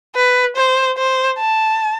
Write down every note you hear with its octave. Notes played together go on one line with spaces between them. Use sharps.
B4
C5
C5
A5